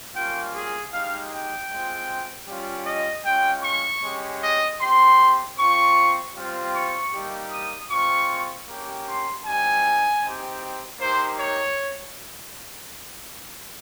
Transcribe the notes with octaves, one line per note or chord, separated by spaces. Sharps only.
G3 A#3 C#4 F4 G5
G#4
G#3 D#4 G4 F5
G5
G#3 C4 F4
G3 C#4 F4
D#5
G#3 C#4 F4 G5
C#6
G#3 C#4 G4
D#5
C4 G4 C6
C4 F4 C#6
G3 C4 F4
C#6
G3 A#3 D#4 G4
D#6
G#3 C4 F4 C#6
A#3 C#4 G4
C6
G3 C4 D#4 G#5
C4 D#4 G4
A#3 D#4 G4 C5
C#5